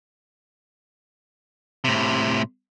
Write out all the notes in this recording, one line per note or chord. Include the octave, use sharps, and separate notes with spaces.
A2 C3